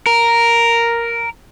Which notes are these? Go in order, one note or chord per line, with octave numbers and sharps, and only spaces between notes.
A#4